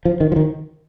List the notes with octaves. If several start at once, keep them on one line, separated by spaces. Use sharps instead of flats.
F3
D#3
F3
D#3